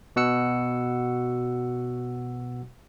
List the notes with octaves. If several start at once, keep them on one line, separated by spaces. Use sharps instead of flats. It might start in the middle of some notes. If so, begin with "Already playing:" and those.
B2 F#4 F#5 E6 C#7